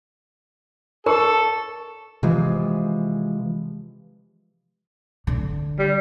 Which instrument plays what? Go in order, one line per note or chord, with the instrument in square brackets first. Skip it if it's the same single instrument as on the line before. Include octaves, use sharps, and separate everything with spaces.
[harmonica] A4 [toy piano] A#4 [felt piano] C#6 E6
[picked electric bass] C3 E3 F3 G#3
[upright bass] D3
[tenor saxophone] G3